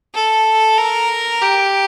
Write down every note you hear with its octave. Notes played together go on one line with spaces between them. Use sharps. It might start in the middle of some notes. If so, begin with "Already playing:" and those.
A4
A#4
G4